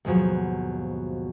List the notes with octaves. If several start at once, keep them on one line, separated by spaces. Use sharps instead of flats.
D#2 G#2 B2 F3 F#3